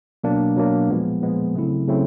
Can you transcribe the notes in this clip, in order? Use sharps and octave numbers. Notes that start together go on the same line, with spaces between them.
B2 F#3 A#3 D4
B2 F#3 A#3 D4
A#2 F3 G#3 B3
A#2 F3 G#3 B3
C#3 F#3 A3 C4 E4
C#3 F#3 A3 C4 E4